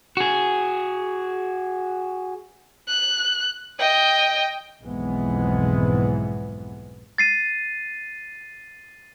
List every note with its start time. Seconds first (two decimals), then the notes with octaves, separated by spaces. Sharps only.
0.17 F#4 G#4
2.88 F#6
3.79 D#5 G5
4.83 B1 F2 G#2 E3 G#3 B3
7.18 A6 C7 D#7